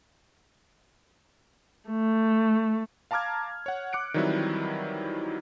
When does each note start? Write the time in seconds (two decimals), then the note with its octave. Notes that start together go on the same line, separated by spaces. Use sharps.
1.90 A3
3.11 F5 A5 A#5 D6 F6 G#6
3.66 C#5 F#5
3.93 D6 F#6 C#7 D7
4.14 D#3 E3 F#3 G3 C4 E4